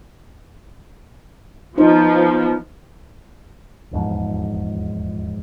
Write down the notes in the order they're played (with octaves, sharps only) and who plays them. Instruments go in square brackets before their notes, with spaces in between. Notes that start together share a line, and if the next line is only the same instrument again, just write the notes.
[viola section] F3 B3 [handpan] D#4 C5
[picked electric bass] D#1 E2 G#2 F3